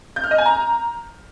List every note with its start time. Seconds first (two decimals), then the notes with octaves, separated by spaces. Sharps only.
0.16 G6
0.24 F6
0.31 D#5
0.38 G#5
0.46 A#5